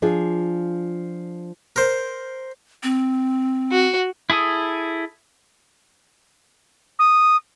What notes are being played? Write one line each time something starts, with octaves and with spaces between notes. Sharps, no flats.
F3 D4 F4 G#4
A#4 C5
C4
F#4
E4 G#4 A4 D#6
D#6